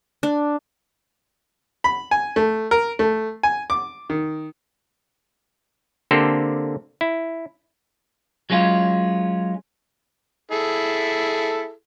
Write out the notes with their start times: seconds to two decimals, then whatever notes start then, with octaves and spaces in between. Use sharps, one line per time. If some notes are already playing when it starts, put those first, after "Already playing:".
0.23 D4
1.84 B5
2.11 G#5
2.36 A3
2.71 A#4
2.99 A3
3.43 G#5
3.70 D6
4.10 D#3
6.11 D3 A#3 C4 G4 A4 C5
7.01 E4
8.50 F#3 G#3 C#4 F4
10.51 E4 G#4 A4